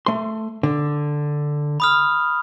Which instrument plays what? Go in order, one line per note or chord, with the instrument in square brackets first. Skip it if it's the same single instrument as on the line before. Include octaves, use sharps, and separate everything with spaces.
[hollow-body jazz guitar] A3 C6
D3
[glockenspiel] B5 D#6 F6